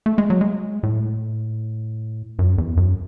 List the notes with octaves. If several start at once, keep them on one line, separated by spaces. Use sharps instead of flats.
A3
G#3
F#3
G#3
A2
F#2
E2
F#2